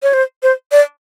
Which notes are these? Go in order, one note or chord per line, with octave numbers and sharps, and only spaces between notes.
C#5
C5
C5
D5